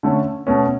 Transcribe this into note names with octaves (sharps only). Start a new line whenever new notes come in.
D3 A3 C#4
B2 A3 C#4